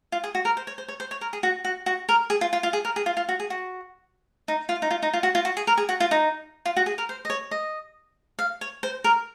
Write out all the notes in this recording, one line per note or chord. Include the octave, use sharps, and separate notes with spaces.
F4
G#4
F#4
A#4
C5
C#5
C5
C#5
C5
C#5
A#4
G#4
F#4
F#4
F#4
A#4
G#4
F4
F4
F4
G#4
A#4
G#4
F4
F4
F#4
G#4
F#4
D#4
F4
D#4
F4
D#4
F4
F#4
F4
F#4
G#4
A#4
G#4
F#4
F4
D#4
F4
F#4
G#4
A#4
C5
D#5
C#5
D#5
F5
C#5
C5
A#4